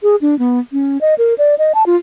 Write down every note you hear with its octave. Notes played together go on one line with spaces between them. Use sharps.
G#4
D4
B3
C#4
D#5
A#4
D5
D#5
A5
F4